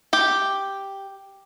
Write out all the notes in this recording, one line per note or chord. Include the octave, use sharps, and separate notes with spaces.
G4 G5